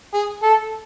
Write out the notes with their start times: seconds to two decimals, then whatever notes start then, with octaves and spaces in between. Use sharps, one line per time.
0.14 G#4
0.43 A4